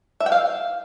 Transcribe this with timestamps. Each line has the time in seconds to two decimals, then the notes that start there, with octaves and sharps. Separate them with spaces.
0.20 E5
0.26 G5
0.32 F5